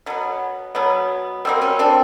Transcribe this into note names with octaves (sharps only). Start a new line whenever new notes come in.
B2 F#3 B3
B2 F#3 B3
B2 G3 A#3 C4
C#4
C4 D4